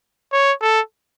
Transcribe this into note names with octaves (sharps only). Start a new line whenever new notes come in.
C#5
A4